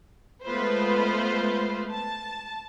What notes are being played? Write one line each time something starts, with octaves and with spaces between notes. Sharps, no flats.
G#3 A3 B3 F4 B4 C5
A5